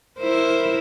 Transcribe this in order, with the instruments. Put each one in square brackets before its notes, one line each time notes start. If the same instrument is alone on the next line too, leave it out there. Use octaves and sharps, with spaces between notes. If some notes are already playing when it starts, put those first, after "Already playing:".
[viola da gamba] E4 A#4 C5